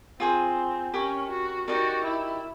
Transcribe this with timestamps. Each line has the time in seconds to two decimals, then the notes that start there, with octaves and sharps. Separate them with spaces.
0.20 C4 F4 G#4 C5
0.94 C#4 G4 A#4 C#5
1.31 F#4
1.68 D#4 F#4 G4 A#4 D5
2.05 E4